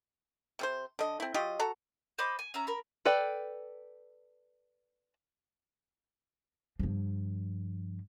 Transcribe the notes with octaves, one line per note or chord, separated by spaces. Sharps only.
C3 C#4 C5
D3 D#5
C4 E4
F#3 F4 G4 D#5
F#4 A4 A#5
C5 D#5 B5 D6
G#5
C#4 E5 A#5
A#4 B5
A4 B4 D5 G5
G2 F3